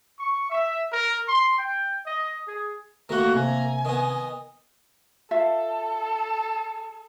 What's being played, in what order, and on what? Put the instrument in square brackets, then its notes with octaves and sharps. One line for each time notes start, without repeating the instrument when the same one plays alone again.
[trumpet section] C#6
E5
A#4
C6
G5
D#5
G#4
[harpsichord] D#3 A#3 [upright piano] A3 [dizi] F#4 [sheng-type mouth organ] A#5
[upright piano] C3 [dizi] G#5
[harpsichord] D#3 B3 [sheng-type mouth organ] D#5
[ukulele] F4 E5 F5 [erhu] A4